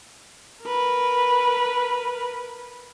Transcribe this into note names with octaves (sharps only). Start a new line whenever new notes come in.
A#4 B4